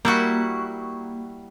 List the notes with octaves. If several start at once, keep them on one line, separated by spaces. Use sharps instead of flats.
G3 A#3 E4 F#4 C#6